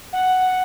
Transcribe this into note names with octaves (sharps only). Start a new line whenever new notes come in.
F#5